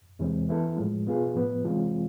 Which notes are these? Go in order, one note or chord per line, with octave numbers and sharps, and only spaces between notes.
E2 C3 E3 G#3 C4
E3 B3 E4 A4
A2 F3 G#3
B2 B3 F4 G#4
A2 F3 B3
C3 E3 G#3 C4 F4